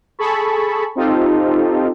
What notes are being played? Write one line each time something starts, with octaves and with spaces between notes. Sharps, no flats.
G#4 A4 A5 B5 C#6
C4 D#4 F4 G4 A4